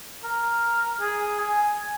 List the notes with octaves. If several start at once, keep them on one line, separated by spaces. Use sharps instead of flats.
A#4
G#4
G#5